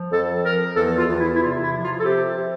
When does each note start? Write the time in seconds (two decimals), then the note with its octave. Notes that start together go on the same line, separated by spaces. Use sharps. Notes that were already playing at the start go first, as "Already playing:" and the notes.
Already playing: F3
0.12 F2 A4
0.45 F3 A#4
0.76 E2 A4
0.97 F4
1.08 E2
1.19 E4
1.35 E4
1.40 C3 F4
1.62 E4
1.73 F3
1.83 F4
2.00 A4
2.05 C3 G4
2.38 C3